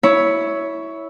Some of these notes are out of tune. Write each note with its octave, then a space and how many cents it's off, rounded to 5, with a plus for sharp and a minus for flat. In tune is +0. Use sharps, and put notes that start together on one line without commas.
E4 -10 C#5 +10